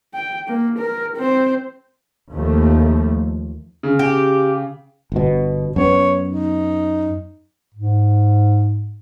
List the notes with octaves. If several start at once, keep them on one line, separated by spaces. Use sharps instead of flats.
G5
A#3
A#4
C4 C5
D#2 F3 A3
C#3
G4
G1 B2
F#2 B3 C#5
D#4
G#2